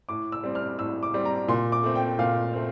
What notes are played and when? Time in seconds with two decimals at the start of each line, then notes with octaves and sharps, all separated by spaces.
0.09 A2 D6
0.32 E6
0.44 G3 C4
0.55 F6
0.79 A2 E6
1.03 D6
1.14 G3 C4
1.25 A#5
1.48 A#2 C6
1.72 D6
1.84 A3 C4
1.95 G5
2.19 A#2 F5
2.53 A3 C4